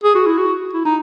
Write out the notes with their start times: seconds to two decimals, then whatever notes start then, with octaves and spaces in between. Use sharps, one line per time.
0.04 G#4
0.15 F#4
0.26 E4
0.38 F#4
0.73 E4
0.85 D#4